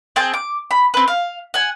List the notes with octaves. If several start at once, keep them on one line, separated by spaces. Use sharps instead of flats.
C4 G#4 G5 A5
D6
B5
C4 B4
F5
F#5 G#5